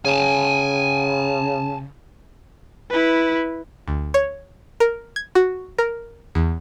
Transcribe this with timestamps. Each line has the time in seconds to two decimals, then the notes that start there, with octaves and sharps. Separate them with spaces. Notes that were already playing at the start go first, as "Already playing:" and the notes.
0.05 C#3 G#5 A5
2.91 E4 B4
3.88 D2
4.14 C#5
4.80 A#4
5.16 G#6
5.35 F#4
5.78 A#4
6.35 E2